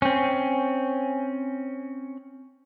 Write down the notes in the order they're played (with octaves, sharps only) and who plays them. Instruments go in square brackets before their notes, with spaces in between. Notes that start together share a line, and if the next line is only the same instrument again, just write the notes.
[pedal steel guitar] C4 C#4